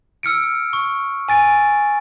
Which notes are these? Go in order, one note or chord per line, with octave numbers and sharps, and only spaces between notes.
E6 F6 C#7 D7
C#6
G#5 A6 D7